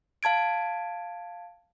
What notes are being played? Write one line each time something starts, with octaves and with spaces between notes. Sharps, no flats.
F5 A5 G#6 D7